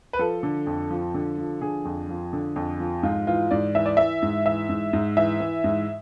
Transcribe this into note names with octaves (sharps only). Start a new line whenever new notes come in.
B4
F3 A4
D3
F2
F3
D3
F3
D3 G#4
F2
F3
D3
F2
F3
G#2 F4
E3 F4
G#2 D5
E3 E5
D5
E3 E5
G#2
E3 E5
G#2
G#2
E3 E5
E3
G#2